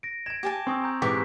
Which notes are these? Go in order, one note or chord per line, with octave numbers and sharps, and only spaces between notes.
A#6 D7
G#6 D7 E7
G4 G#5 A5
C4 C#6 D#6 E6
A#5 G6
G#2 E3 G4 C#6 B6